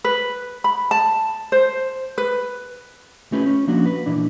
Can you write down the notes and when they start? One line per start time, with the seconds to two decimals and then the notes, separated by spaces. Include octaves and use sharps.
0.04 B4
0.64 B5
0.91 A5
1.52 C5
2.18 B4
3.32 A3 C#4 F4 G4 B4
3.46 C#4
3.67 F3 A#3 D4 F#4
3.86 B4
4.06 A#2 E3 D4